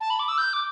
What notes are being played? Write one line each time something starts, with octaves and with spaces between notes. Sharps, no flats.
A5
B5
D6
E6
G6
D6